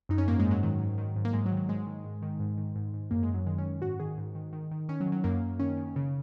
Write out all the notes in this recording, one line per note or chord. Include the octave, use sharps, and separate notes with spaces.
F#2 D#4
C#4
G#2 A#3
G#3
G#2
F#3
D#3 F#3
G#2
D#3
G#2
A#3
G#2 G#3
F#3
D#3
F#3
G#2 G#3
D#3
G#2
D#3
G#2
D#3
G#2
G#2
F#2 A#3
G#3
F#2
F#3
D#3 G#3
C#4
D#3
G#2 F#4
D#3 G#4
G#2
D#3
D#3
D#3
D#3 C#4
F#3
D#3
F#3
F#2 A#3
F#2
D#3 C#4
D#3
C#3